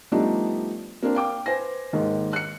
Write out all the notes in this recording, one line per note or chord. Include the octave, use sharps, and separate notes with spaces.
F3 G3 A3 B3 D4 D#4
A#3 C4 D4
F5 G5 D6
B4 C5 G#5 A#6
D#2 G#2 D#3
F#6 C#7